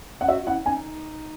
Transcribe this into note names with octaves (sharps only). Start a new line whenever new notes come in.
F#5
F#4 E5
F#4
E4 F#5
D#4 G#5